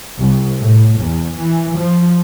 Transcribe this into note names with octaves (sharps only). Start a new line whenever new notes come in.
C2
A2
E2
E3
F3